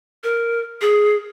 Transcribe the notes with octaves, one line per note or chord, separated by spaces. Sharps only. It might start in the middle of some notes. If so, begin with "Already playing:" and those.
A#4
G#4